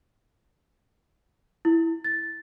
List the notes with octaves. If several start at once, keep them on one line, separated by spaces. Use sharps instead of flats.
E4
A6